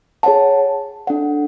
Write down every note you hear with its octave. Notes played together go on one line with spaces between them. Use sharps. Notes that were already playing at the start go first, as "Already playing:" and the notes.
G#4 C#5 F#5 A5
D4 A4 D5 F#5